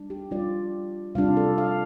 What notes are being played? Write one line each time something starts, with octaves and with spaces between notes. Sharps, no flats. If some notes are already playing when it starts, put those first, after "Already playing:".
Already playing: G3 D4
G4
G3 D4 F4 D5
C3 G3 D4 F4 F5
A4
F5